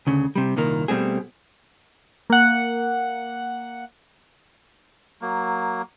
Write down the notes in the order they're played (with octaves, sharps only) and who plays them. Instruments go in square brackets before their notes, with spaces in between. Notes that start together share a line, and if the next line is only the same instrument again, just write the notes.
[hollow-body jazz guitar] D2 C#3
C3 G3
C2 A#2 D#3 A#3
B2 G3 A3 C4 G#4
[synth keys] A#3 F#5
[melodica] F#3 A#3